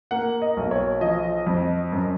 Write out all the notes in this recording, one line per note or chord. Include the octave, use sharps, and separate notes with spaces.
A#3 F#5
D#5
B1
C#5
F3 D#5
F2
F#2